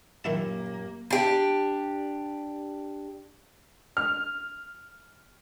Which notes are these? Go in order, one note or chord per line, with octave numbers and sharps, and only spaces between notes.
F#2 A#2 D#3 A#3 E4 G4 A5
D4 G4
F6